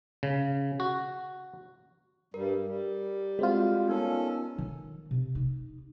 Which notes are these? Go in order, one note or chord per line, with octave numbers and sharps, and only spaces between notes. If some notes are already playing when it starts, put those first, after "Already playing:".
C#3
F#4
G2 G3 A#4
G3
G#3 C4 F4 F#4
B3 C#4 D#4 A4 A#4
D#3
C3
D#4